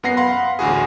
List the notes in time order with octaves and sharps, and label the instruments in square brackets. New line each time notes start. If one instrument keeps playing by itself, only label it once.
[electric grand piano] F#2 B3 F#5 A#6 C7
F5 F#5 B5 C6
A1 D2 F#4 G#4